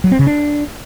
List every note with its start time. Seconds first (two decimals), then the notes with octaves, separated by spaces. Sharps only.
0.04 F#3
0.12 C4
0.19 C#3
0.27 D4